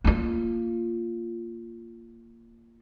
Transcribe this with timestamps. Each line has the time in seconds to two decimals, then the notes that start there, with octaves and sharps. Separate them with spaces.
0.04 A#3 F4